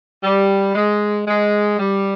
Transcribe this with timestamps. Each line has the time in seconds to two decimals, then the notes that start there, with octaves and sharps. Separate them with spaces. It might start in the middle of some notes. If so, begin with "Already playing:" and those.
0.24 G3
0.75 G#3
1.27 G#3
1.79 G3